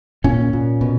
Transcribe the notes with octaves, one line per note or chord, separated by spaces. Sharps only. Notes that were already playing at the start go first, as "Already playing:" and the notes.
A#2 C#4
A#2
B2